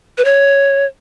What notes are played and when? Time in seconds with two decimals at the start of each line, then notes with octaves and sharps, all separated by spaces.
0.18 B4
0.25 C#5